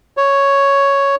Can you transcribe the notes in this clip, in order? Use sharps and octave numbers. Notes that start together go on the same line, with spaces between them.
C#5